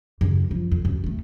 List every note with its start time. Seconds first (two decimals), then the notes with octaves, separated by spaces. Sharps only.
0.21 F#2 C#3
0.51 F3 F4
0.71 F2
0.85 F#2
1.04 D#3 A3